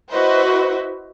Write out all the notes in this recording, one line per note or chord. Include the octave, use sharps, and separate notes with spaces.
E4 F#4 B4 C5 D#5 E5